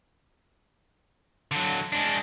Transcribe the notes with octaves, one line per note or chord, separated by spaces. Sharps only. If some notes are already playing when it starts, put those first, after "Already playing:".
D3 F#3
G#3 D4